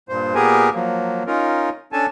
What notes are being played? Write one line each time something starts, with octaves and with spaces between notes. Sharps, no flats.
G2 A#2 C5
A#2 B3 G4 G#4 A#4 G#5
F3 F#3 A#3
C#4 D#4 F4 A#4
C#4 D4 A4 G#5 A5